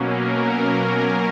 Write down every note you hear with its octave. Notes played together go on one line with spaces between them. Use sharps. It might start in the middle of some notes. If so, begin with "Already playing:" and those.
Already playing: B2 F#3 A#3 C#4
A#4
A#4